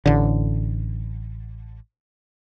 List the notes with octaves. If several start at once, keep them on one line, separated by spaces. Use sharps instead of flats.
A1 D3